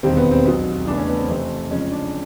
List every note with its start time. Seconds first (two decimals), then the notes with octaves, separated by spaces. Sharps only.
0.03 E1 D#2 D#3 G3 C4
0.17 B3
0.31 C4
0.45 B1 B2 F#3
0.87 E2 C#3 E3 A3 D4
0.98 C#4
1.08 B3
1.19 C4
1.29 F2 C3 E3 A3 C4
1.71 F2 C#3 F3 G#3 C#4
1.92 D4